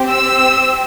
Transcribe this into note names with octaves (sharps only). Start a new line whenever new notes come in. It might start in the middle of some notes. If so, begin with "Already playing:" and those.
Already playing: C4 G4
E6